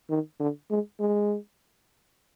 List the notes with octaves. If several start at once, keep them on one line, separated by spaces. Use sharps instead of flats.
D#3
D3
G#3
G#3